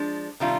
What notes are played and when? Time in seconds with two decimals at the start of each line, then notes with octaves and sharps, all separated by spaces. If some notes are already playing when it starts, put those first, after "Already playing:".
Already playing: F3 G#3 D4
0.40 C3 D#3 G3 D4 F4